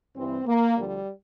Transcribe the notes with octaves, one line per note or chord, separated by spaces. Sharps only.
G2 E3 C4
A#3
D2 D3 F3 G3